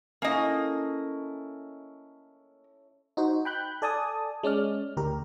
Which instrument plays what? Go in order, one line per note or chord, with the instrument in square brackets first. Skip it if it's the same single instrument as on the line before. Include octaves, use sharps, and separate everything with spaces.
[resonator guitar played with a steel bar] A#3 D#5 [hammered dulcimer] C#4 E4 A4
[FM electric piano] D#4 F#4 C5
G5 B5 F#6 G6
A4 D5 G#5 A5 D#6
G#3 C#4 D5 F6
D2 G4 A#4